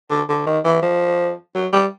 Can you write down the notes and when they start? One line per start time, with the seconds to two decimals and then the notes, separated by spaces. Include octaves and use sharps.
0.10 D3
0.29 D3
0.46 D#3
0.64 E3
0.82 F3
1.55 F#3
1.73 G3